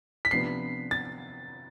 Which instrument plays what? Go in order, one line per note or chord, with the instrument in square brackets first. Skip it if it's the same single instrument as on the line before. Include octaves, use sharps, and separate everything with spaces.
[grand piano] B6
[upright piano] C3 F3 B3 D4 [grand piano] C7
[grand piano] A6